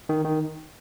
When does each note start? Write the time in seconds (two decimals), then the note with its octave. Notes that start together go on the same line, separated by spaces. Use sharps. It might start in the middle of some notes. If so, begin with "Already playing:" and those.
0.09 D#3
0.25 D#3